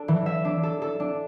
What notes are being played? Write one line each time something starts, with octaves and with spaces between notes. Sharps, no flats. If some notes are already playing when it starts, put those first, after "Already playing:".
Already playing: D4 A4
E3
E5
D4
A4
A4
D4